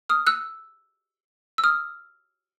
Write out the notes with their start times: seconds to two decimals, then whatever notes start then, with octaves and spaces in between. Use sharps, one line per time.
0.09 D#6 F6
0.27 E6 F#6
1.58 E6
1.64 D#6 F6